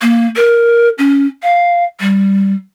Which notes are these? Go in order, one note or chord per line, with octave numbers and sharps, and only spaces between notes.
A#3
A#4
C#4
F5
G3